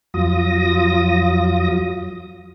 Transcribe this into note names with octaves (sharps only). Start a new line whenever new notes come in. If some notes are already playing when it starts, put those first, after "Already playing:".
F2 F#3 F4 D#6 A#6